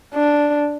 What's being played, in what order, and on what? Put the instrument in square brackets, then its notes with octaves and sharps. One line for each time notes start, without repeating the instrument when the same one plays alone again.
[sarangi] D4